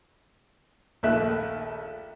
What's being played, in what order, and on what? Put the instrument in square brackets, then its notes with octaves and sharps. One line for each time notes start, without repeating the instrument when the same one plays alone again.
[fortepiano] A#1 D#2 A3 E5 F#6